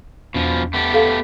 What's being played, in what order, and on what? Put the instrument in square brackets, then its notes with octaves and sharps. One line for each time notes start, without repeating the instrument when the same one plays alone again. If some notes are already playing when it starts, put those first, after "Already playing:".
[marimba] E2 [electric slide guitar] B2 F3
[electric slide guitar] A3 B3 G4
[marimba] A4 F5